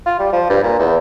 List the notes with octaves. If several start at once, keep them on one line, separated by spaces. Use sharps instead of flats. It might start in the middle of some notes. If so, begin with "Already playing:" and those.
F4
G3
F3
G2
A#2
E2